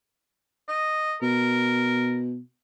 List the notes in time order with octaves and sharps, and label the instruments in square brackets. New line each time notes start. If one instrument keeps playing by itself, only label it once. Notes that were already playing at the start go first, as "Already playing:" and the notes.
[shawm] D#5
[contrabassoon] B2 [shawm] A#4